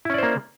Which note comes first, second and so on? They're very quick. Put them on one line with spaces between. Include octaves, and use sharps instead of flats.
E4 C#4 D5 C5 A#3